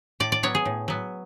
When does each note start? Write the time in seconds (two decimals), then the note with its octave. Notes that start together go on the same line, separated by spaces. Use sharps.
0.20 A2 D5
0.32 D5
0.43 F#3 B3 C#5
0.55 G#4
0.65 A2
0.88 F#3 B3